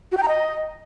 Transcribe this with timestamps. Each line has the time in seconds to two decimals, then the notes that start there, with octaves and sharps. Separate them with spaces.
0.12 F#4
0.17 G5
0.23 A#5
0.28 D#5